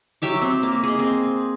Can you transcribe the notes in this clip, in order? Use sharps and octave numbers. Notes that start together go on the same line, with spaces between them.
F#3 G4 E5 D6
C4
A#3
G#4 D#5
C4